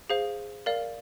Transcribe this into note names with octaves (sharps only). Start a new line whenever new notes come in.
G#4 C5 F5
A#4 D5 F5